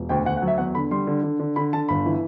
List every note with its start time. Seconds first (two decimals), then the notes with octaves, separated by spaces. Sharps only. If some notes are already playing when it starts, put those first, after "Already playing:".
Already playing: E1
0.09 D2 G5
0.25 D2 F#5
0.37 F#5
0.42 F#3
0.47 E5
0.58 E2 F#5
0.75 D3 B5
0.91 G3 C6
1.07 D3
1.23 D3
1.39 D3
1.56 D3 B5
1.73 D3 A5
1.89 G1 B5
2.06 E3